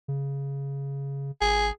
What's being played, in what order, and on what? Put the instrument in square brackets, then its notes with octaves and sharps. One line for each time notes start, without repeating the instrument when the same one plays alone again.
[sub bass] C#3
[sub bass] G#1 [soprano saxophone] G#4